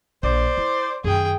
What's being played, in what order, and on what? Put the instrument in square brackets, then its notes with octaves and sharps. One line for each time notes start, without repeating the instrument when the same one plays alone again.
[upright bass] A#1 [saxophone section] C5 D5
[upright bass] E4
[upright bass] F#2 D#3 [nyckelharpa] G#4 G5